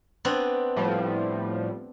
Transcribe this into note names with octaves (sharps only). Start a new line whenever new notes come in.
B3 C4 D4
A2 F3 G3